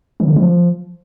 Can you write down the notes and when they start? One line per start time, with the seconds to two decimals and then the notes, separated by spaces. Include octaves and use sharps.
0.20 D#3
0.28 D3
0.36 F3